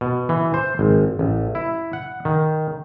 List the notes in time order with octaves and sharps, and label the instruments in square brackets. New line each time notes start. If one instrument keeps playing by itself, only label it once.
[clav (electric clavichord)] B2
E3
C5
G#1
A1
E4
F#5
D#3